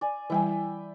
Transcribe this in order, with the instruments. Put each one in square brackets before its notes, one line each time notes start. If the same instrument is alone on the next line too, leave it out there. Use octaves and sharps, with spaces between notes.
[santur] D5 G#5
[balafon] E3 G3 [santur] E4 G5 G#5